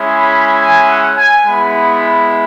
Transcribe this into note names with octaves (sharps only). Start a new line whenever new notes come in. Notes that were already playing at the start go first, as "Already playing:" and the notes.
Already playing: G#3 C#4 E4
B5
G#5
F#5
G#5
G#3 B3 E4 B5